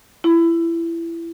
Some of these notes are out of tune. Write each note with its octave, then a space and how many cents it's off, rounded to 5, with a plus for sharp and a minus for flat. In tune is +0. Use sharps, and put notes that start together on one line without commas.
E4 +20